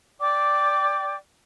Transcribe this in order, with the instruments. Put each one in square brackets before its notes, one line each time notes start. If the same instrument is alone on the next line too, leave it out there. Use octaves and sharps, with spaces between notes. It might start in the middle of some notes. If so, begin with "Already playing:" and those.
[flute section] D5 G5 D6